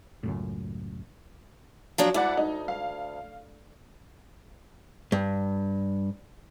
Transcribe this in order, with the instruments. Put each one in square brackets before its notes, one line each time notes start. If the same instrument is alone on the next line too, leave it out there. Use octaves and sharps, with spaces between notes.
[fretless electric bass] C#2 F#2 A2
[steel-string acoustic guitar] F3 F#3 D4
[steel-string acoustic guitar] D2 [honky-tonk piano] E4 D5 F#5
[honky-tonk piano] D#4
F5
[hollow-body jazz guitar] G2